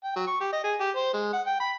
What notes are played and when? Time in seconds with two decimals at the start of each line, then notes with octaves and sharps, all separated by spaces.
0.04 G5
0.16 F#3
0.27 C#6
0.40 G4
0.52 D#5
0.64 G#4
0.80 G4
0.96 C5
1.14 G#3
1.33 F#5
1.46 G5
1.60 B5